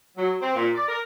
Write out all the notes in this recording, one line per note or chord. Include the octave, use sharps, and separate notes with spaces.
F#3
C4
A#2
D5
A#4